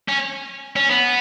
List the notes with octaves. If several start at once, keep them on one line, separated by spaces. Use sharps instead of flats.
C#4
C#4
B3